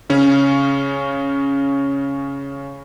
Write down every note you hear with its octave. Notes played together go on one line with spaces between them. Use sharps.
C#3 C#4